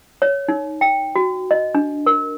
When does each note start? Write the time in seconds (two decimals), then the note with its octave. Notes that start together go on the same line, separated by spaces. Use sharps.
0.22 C#5
0.48 D#4
0.81 G5
1.16 F#4
1.51 D#5
1.75 D4
2.06 A#4